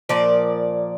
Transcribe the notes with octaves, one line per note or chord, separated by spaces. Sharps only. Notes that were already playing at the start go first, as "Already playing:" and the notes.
A#2 F3 D5